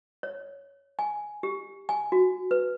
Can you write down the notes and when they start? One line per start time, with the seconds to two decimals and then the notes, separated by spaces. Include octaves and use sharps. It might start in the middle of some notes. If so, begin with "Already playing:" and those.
0.23 C#5
0.99 G#5
1.43 G4
1.89 G#5
2.12 F#4
2.51 B4